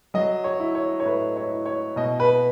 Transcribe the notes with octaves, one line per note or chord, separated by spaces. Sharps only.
F#3 D#5
C#5
E4
C#5
C#5
A2 B4
C#5
E4
C#5
B2 D#5
B4